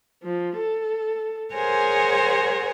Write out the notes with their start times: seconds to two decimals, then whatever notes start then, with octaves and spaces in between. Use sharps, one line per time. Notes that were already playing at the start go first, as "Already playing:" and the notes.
0.22 F3
0.58 A4
1.53 G#4 A#4 C5 C#5 F#5 G#5